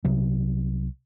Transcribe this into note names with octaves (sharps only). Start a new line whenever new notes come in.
C2 C3 F#3